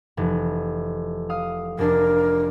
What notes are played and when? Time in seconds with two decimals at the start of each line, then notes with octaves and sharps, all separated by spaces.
0.17 F1 E3
1.30 F5 D#6 F6
1.79 F1 D4 A#4